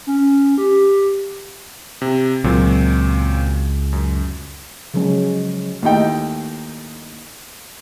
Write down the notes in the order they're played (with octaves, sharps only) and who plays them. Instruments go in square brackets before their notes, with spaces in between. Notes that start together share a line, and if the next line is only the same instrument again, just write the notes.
[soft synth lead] C#4
G4
[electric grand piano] C3
[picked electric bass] C#2 [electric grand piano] A#2 F#3 C4
[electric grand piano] F#2
[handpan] C#3 F3 F#3 G#3 C#4
[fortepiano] D#2 A2 D#4 G5